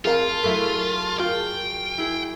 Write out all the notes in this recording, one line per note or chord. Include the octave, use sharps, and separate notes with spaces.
F2 F4 G#4 A#4 F5 A5
F#2 A3 E4
F4 G5
E4 G#4